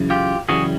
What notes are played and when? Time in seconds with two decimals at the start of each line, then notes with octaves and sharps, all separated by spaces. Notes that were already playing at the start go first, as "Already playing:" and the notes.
Already playing: F#2 C#3 E3
0.10 F4 G4
0.49 F#2 C#3 E3 G3 F#4 G#4